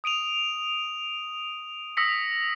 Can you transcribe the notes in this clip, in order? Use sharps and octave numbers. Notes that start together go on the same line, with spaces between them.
D#6 D7 D#7 F7
D#6 E6 A#6 B6 C#7